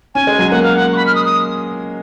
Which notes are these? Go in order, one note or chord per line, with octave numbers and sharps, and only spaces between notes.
C#4 G#5
G#3
F#3
A#3 F#5
F5
F#5
C#6
B5
F6
D#6
D#6